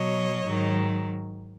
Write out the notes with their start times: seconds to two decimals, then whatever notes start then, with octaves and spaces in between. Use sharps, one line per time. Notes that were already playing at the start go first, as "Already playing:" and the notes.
Already playing: B2 F#3 C#5 D#5
0.44 G#2 D#3 F#3